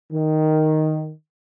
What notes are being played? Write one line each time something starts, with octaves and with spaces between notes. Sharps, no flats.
D#3